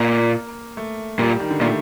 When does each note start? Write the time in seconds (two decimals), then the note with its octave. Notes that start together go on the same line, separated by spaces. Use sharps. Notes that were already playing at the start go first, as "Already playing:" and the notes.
Already playing: A#2 A#3
0.77 A3
1.19 A#2 G3
1.30 G3
1.40 D#3
1.51 D3
1.61 A#2 A3